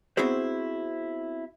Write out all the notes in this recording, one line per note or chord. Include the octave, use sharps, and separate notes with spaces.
B3 C4 E4 F#4 G#4 C5